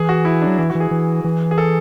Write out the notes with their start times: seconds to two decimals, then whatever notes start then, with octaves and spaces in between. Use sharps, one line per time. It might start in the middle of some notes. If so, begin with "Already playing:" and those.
Already playing: E3 G#4
0.09 F#4
0.25 E4
0.42 D4
0.47 F#3
0.58 E3 E4
0.70 F#4
0.75 E3
0.80 G#4
0.91 E3
1.24 E3
1.51 G#4
1.58 A4